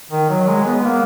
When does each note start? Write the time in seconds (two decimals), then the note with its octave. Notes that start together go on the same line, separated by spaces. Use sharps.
0.11 D#3
0.29 F#3
0.48 G#3
0.66 B3
0.84 A#3